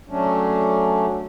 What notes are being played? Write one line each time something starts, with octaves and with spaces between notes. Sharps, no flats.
F#3 A3 C#4 D4